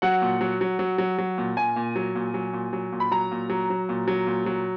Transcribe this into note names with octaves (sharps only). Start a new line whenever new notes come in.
F#3 F#5
A#2
F#3
F#3
F#3
F#3
F#3
A#2
A#2 G#5
A#2
F#3
A#2
F#3
A#2
F#3
A#2
B5
F#3 A#5
A#2
F#3
F#3
A#2
F#3
A#2
F#3